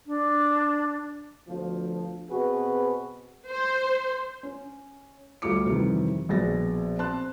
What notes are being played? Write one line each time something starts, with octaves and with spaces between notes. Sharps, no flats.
D4
D2 B2 F3
B2 C4 F#4 G#4 B4
C5
C#4
D2 G3 F4 A4 D6 C#7
F2 C3 D#3 E3 G3
A#1 B2 G#3 A6 A#6
C4 A5 C6 F#6